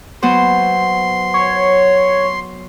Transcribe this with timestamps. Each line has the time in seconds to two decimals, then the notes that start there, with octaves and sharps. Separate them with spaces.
0.23 F#3 B3 C5 C6
1.34 C#5